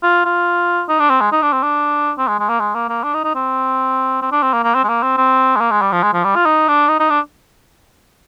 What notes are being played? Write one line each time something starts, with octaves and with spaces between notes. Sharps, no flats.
F4
F4
D#4
D4
C4
G#3
D#4
D4
C4
D4
C4
G#3
G#3
A#3
G#3
A#3
A#3
D4
D#4
D#4
C4
C4
D4
C4
A#3
A#3
C4
G#3
A#3
C4
C4
G#3
A#3
G#3
G3
F3
G#3
F3
G3
F4
D#4
D4
D#4
D#4
D4